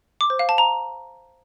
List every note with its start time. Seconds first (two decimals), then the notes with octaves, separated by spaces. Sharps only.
0.21 D6
0.30 C5
0.39 F5
0.49 A5
0.58 A#5